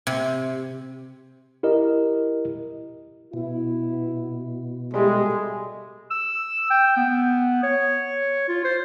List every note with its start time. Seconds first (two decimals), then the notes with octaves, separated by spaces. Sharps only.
0.07 C3
1.63 E4 G4 A#4 D#5
3.33 B2 B3 E4
4.94 G3 G#3 G4 A4 E5
6.11 E6
6.71 G5
6.97 B3
7.63 C#5
8.48 F4
8.64 C5